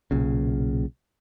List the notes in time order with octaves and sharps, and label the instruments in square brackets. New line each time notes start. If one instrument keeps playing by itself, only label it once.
[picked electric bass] B1 A#2 C#3